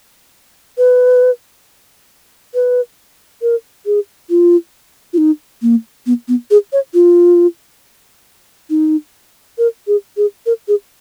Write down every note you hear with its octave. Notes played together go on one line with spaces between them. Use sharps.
B4
B4
A#4
G#4
F4
F4
D#4
A#3
B3
B3
G#4
C#5
F4
D#4
A#4
G#4
G#4
A#4
G#4